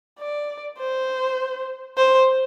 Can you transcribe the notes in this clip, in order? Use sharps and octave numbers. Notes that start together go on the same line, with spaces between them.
D5
C5
C5